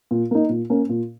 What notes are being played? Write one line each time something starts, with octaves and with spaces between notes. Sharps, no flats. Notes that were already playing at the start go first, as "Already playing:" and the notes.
A#2
A#3 D#4
A#2
A#3 C#4
A#2